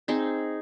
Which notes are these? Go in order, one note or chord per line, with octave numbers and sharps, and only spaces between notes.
C4 D#4 G#4